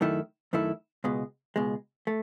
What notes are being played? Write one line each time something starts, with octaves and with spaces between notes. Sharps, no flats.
F#2 D#3 A3 E4
F#2 D#3 A3 E4
C#2 B2 G#3
C#2 B2 G#3
A3